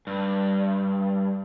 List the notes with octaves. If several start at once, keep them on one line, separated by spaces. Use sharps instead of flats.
G2